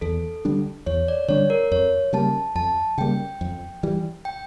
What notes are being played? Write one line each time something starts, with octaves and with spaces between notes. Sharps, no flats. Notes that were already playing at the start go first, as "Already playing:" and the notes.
E2 A4
D3 G3 D4
E2 C#5
D5
D3 G3 D4 C#5
A#4
F2 C#5
C#3 G3 A#3 A5
F2 A5
C#3 G3 A#3 G5
F2
E3 G3
G5